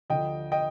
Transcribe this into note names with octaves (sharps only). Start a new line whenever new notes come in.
D2 D3 F3 D#5 G5
D#5 G5